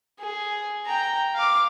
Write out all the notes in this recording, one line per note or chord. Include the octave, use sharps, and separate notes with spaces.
G#4
G5 A#5
F5 D6